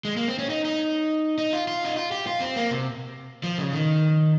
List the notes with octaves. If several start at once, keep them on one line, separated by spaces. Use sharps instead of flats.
G#3
A#3
C4
C#4
D#4
D#4
D#4
F4
F4
D#4
F4
G4
F4
C4
A#3
C3
F3
C#3
D#3